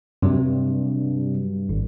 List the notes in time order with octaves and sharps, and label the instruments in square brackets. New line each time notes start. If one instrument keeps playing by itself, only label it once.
[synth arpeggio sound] G2 [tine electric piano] C3 F#3
[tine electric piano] G#1